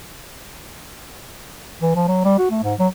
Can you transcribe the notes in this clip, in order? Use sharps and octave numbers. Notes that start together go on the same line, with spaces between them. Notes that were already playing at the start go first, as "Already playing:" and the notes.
E3
F3
F#3
G3
F#4
A3
G#2
F#3